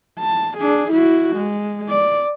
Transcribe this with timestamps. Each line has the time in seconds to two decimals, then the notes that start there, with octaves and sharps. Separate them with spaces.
0.19 A5
0.58 D4 G#4
0.91 E4 F#4
1.36 G#3
1.89 D5